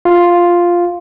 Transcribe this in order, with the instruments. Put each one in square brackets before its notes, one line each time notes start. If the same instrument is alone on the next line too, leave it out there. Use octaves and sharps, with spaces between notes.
[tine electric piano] F4